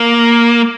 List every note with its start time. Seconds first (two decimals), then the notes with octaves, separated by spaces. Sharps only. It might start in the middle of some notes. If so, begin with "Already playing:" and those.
Already playing: A#3